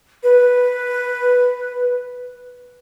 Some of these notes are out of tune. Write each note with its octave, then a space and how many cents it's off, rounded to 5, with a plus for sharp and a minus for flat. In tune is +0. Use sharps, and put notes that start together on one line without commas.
B4 +0